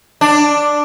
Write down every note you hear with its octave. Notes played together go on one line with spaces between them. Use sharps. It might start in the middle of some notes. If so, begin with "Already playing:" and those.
D4